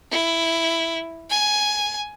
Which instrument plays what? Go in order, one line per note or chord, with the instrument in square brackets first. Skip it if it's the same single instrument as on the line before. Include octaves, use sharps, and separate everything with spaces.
[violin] E4
G#5